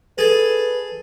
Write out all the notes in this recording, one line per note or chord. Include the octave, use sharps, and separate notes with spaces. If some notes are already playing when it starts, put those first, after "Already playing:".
G#4 A4 B4